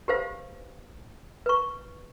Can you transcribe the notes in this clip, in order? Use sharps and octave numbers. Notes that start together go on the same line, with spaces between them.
G4 B4 C5 F5
B4 C#6